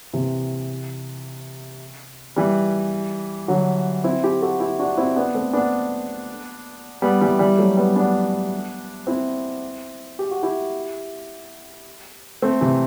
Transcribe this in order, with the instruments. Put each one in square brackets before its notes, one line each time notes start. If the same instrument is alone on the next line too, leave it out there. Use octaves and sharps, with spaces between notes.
[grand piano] C3 E3
E3 G3
D3 F#3
C4 E4
E4 G4
F#4 A4
E4 G4
D4 F#4
C4 E4
B3 D4
A3 C4
B3 D4
G3 B3
E3 G3
E3 G3
F#3 A3
G3 B3
B3 D4
C4 E4
G4
F#4
E4 G4
A3 C4
C3 E3